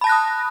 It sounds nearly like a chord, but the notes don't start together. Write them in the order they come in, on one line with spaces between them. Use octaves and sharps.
B5 A5 A#6 F#6 D#6